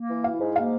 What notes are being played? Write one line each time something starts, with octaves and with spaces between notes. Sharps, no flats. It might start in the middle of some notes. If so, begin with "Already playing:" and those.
Already playing: A#3
E3
E4 F5
G#2
A#3 F5